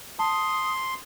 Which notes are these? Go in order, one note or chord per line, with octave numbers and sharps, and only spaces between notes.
A5 C6 D#6